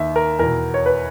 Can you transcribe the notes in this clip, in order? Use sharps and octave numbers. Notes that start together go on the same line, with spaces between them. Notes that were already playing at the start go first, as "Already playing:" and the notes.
Already playing: D#2 D#3 E5
A#4
E2 B2 A#4
C#5
B4